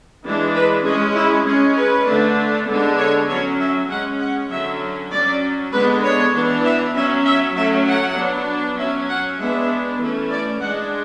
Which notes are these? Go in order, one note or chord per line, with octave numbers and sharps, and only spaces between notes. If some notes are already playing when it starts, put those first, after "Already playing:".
E3 G#3 D4
B4
G#3 C#4 G#4
E4
G#3 C#4 G#4
B4
D3 A3 D4
D3 G#3 B3 D4
C#5
F#3 C#4 C#5
E5
G#3 C#4 F#5
F#5
D3 F#3 C#4 E5
F#3 C#4 D5
D3 G#3 B3 D4 B4
C#5
E3 B3 D4
E5
F#3 C#4 E5
E5
F#3 A3 C#4 E5
F#5
F#3 B3 D4
F#3 C#4 E5
F#5
G#3 B3 D4 E5
E3 A3 C#4
D5
G#3 D4 F#5